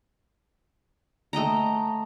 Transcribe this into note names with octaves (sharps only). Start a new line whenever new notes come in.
A3 D#5 G5 A#5